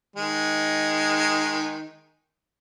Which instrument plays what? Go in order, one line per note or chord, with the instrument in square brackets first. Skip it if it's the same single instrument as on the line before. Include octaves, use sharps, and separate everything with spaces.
[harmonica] D#3 G#3